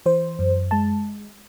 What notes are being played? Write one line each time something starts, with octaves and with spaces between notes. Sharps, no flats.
E3 C5
F#2
G#3 A5